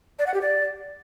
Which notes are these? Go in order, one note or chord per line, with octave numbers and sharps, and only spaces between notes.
D5
F#5
G4
D5